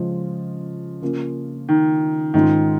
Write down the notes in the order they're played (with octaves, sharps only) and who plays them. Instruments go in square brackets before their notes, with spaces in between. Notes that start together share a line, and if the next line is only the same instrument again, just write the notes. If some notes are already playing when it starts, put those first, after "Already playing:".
Already playing: [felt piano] C#3 G#3 C#4 F4 [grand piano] F3
[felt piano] C#3 A#3 C#4 F4
[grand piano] D#3
[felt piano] G#2 G#3 C#4 F4 [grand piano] D#3